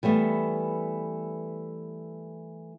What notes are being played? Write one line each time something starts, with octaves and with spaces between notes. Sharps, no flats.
E3 G3 A3 B3